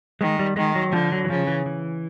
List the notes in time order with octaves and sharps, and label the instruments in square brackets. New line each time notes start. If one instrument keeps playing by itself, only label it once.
[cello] D#3 [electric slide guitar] G#3
[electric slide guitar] G3
[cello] D#3 [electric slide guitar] G#3
[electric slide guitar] F#3
[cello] D3 [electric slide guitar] F3
[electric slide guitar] F#3
E3
[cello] C#3 [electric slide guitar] F3
[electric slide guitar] E3
E3